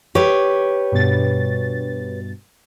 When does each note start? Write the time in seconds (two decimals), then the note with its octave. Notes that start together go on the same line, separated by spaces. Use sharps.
0.15 G4 B4 C#5
0.92 G2 B2 A6